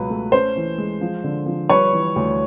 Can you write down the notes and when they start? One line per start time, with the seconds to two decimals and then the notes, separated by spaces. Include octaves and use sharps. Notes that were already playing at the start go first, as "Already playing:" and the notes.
Already playing: C#2 B2 F#3 B4
0.10 A3
0.32 C#4 C5
0.56 E3
0.78 G#3
1.01 F3
1.24 D3
1.47 F3
1.69 G3 B4 C#5
1.93 E3
2.16 D2